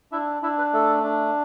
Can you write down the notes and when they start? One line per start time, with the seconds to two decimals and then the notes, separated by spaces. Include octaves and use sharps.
0.12 D4 E4 E5
0.43 D4 E4 E5
0.58 B4
0.73 A3 A4
1.03 D4